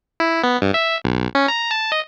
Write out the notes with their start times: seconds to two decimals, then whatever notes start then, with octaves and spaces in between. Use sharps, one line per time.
0.20 E4
0.44 B3
0.62 G2
0.74 E5
1.04 B1
1.35 C#4
1.48 A#5
1.71 A5
1.92 D#5